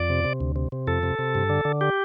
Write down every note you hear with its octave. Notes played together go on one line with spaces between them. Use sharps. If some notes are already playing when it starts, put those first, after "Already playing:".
Already playing: F2 D5
C3
C3
D2
C3
C3
F2 A4
C3
C3
G2
D3
D3
G4